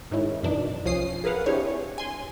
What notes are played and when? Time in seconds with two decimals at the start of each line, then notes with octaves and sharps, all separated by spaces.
0.11 G#2 D#3 G#3 C#4 E4
0.43 F#2 B2 E3 D4 D#4
0.85 C2 F3 C#4 D#6 C7
1.24 G#4 A#4 B4 F5 F#5
1.46 C4 D4 E4 G4 G#4 C#5
1.98 G#5 C6